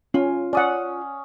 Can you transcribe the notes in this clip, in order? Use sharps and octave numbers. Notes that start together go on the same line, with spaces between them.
C#4 F4
C#4 D5 F#5 D#6